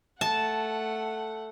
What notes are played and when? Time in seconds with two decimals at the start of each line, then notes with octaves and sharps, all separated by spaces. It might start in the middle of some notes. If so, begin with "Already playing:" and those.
0.21 A3 F#5 A5